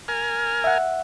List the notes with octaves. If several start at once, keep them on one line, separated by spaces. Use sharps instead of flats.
A#4 G#5 F6
E5 F#5